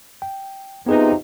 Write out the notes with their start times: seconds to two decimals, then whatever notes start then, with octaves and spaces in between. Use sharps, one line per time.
0.22 G5
0.86 C3 F3 B3 D#4 G#4 B4